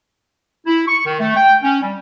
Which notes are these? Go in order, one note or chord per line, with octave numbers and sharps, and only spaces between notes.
E4
C#6
D#3
A3
G5
C#4
G3